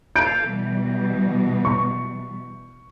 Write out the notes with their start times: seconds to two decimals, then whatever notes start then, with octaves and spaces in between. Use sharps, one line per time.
0.16 A4 F5 G6 D7
0.45 B2 E3 G3
1.65 C#6